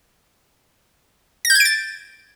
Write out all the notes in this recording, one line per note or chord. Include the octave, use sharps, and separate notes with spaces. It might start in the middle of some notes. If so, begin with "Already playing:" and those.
A#6
G6
G#6
D7
A6